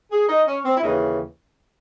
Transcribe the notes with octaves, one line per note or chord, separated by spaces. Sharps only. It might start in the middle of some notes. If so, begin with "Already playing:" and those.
G#4
D#4
C#4
C4
E4
D#2 C#3 E3 D#4